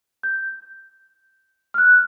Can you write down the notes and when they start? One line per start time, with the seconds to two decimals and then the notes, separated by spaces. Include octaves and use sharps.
0.23 G6
1.74 F6
1.78 F#6